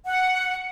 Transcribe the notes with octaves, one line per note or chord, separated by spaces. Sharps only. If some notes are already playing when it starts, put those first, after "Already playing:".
F#5